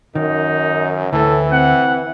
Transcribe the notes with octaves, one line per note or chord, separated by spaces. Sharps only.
F#2 D#3 D#4
D2 A2 E3 A4
C4 F#5